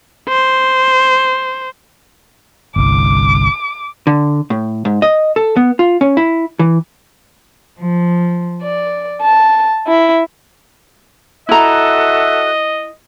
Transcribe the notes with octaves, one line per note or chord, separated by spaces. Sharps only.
C5
G1 C2 D6
D3
A2
G#2
D#5
A4
B3
F4
C#4
E4
E3
F3
D5
A5
E4
E4 F#4 A4 D#5 E5 A#5 F#6